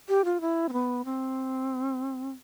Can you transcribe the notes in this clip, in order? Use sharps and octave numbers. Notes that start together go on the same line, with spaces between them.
G4
F4
E4
C4
B3
C4